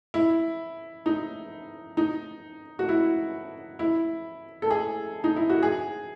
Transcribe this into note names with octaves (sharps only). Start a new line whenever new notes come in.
E4
D#4
D#4
F#4
E4
E4
A4
G#4
D#4
E4
F#4
G#4